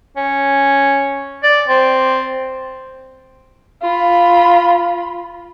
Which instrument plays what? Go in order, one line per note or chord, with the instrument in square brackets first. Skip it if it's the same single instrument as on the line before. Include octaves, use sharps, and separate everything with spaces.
[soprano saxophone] C#4
D5
C4
[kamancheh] F4 B5